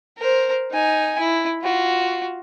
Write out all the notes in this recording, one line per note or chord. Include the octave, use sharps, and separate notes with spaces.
A#4 C5
D#4 G#5
E4
F4 F#4